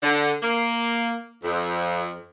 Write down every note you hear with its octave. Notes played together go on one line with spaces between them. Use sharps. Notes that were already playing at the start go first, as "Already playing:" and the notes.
D3
A#3
F2